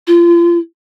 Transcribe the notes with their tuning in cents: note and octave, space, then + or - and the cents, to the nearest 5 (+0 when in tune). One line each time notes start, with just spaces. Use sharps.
F4 -30